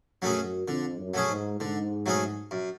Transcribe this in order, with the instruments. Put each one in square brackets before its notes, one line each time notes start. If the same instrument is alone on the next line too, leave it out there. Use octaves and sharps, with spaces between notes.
[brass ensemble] F#2 [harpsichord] F#3 A3 C#4 G#4
[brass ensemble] F2 [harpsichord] D3
[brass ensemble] F#2
[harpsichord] F#3 A3 C#4 G#4
[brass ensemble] G#2
[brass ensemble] G#2 [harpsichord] D3
[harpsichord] F#3 A3 C#4 G#4
F#2